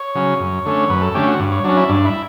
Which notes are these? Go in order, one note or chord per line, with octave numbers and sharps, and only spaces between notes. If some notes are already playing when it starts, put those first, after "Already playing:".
Already playing: C#5
C#3 F#3 C#4
F#2
D3 A3 C#4
F#2 B4
A4
D3 A3 C#4 G4
F#4
G2
C#5
F#3 C#4 D4
E4
G2 D4
E4